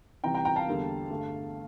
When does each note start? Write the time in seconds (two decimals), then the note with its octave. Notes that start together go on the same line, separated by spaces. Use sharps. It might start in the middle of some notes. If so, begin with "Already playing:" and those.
0.24 C3 E3 G3 G5 A#5
0.34 G5 A#5
0.45 G5 A#5
0.56 F5 A5
0.67 E2 D3 G3 A#3
1.10 G2 D3 A3